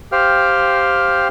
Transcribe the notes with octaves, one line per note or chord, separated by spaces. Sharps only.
G4 C5 F5 G5 F6